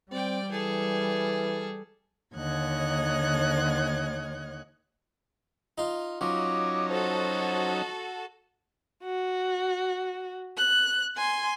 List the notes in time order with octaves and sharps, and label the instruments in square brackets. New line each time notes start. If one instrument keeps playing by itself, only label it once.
[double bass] G3 [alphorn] C4 [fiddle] D5 G5
[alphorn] E3 [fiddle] G#4 A4
[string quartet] D#2 D3 C#5 D#5 F#6 G#6
[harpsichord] D#4 F4
[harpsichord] F3 [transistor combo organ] F#3 C#4 D#4 [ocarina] D6
[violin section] F#4 A4 [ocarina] C5
[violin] F#4
F#6
G#5 C6